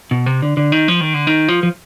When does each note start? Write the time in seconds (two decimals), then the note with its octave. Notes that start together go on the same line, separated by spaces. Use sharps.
0.11 B2
0.26 C3
0.42 D3
0.57 D3
0.72 D#3
0.88 F3
1.01 D#3
1.14 D3
1.27 D#3
1.48 F3
1.63 F3